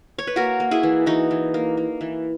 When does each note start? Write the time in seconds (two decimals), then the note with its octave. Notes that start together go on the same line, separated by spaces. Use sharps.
0.18 C#5
0.27 B4
0.36 A#3 F#4 A#4
0.60 A#3
0.71 E4 G#4
0.83 E3
1.06 E3 D#4 F#4
1.31 E3
1.54 A#3
1.77 A#3
2.01 E3